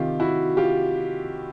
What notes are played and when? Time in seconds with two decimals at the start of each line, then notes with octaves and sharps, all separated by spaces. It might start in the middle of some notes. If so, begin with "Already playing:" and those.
Already playing: C3 D#3 F4 G4
0.20 E4 F#4
0.57 F4 G4